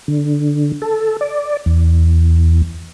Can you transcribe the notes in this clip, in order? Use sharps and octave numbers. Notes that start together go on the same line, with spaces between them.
D3
A4
D5
E2